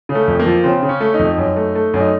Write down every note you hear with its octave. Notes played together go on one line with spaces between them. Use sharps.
C#3
A3
F2
A#3
F3
C#3 C4
C#3
C#4
A3
D#4
F2
F#2
A3
A3
F#2
D#4